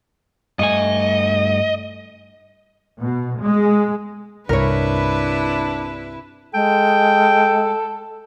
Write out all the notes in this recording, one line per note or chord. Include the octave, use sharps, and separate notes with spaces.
G2 A3 D#5 G#5
B2
G#3
C2 G2 C3 D4 E4 A#4 B4 C#5
G#3 A4 G5